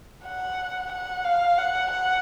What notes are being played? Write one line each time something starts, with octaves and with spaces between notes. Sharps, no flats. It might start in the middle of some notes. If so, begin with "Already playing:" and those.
F#5
F#5
F5
F#5
F#5